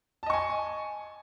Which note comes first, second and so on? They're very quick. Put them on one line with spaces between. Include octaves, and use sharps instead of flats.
A5 D#5 C#6 G#5